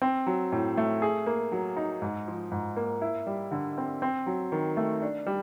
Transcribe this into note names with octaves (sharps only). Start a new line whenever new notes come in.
C4
F#3
A2
A3
G#4
A#3
F#3
D#4
G#2
F3
G#2
A#3
E4
G3
D3
C4
C4
F#3
D#3
A3
D4
G3